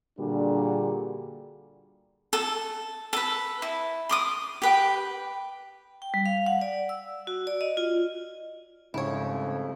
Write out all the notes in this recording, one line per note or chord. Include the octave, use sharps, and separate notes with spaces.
A#2 D3 G3 D4 F#4 G#4
A4
A4 B4
E4
C6 D6 D#6
G4 B4 G5
G5
G3
F5
F#5
D5
E6
F#4
D5
D#5
F4
C2 F2 G#2 C#3 A3 E4 C#5